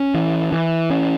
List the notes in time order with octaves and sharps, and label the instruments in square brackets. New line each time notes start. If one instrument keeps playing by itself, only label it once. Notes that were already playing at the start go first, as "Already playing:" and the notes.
Already playing: [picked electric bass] C#4
E3
E3
C#4